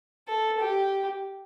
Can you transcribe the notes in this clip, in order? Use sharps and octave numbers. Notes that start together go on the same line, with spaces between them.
A4
G4